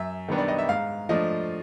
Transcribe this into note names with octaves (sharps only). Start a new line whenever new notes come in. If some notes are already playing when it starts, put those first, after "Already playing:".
Already playing: F#2 E5
D#3 G3 B3 D4
D5
D#5
E5
G#2 F5
F3 A3 D4 D#5